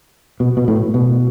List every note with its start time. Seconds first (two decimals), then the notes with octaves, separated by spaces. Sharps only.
0.40 B2
0.57 B2
0.68 A2
0.94 B2